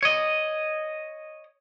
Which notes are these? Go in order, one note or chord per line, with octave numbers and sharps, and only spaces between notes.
C#5 D#5